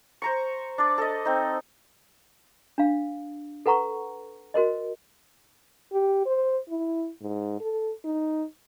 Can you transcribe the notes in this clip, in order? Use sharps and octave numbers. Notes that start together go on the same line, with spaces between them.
C5 A#5 C#6
D4 D5
A4 D#5
C4 D#4
D4 F5
A4 B4 F#5 A#5 C#6
F#4 A#4 C5 D#5
G4
C5
E4
G#2
A4
D#4